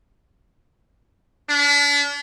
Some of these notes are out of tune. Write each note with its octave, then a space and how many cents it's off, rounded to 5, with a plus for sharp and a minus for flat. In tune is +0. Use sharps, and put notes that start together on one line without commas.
D4 -40